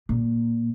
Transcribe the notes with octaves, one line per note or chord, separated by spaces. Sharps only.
A#2